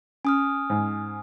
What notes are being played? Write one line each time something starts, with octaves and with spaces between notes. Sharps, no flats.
C#4 G#5 D#6 F6
G#2